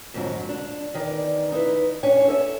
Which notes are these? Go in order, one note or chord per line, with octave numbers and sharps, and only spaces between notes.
F2 G#2 D3 F#3
D4
E2 D#3 D5
D#4 E4 B4
C#4 D4 C#5 G#5
A4 C#5 D#5 E5